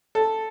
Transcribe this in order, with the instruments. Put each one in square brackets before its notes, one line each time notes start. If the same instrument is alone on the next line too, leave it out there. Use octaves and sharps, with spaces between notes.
[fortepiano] A4